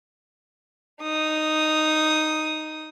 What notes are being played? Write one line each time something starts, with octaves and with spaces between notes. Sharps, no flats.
D#4 D#6